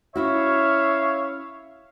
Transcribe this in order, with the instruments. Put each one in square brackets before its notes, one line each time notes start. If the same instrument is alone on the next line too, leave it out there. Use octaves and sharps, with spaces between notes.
[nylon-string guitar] C#4 E4 F#4 [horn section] C#5 E5 F5